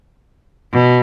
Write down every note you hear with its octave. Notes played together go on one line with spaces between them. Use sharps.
B2